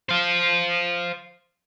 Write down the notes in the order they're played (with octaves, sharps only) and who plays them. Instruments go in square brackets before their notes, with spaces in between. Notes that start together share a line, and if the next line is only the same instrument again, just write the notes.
[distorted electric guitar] C5 F5